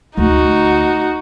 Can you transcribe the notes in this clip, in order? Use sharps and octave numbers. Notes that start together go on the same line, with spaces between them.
D2 A3 D#4 F#4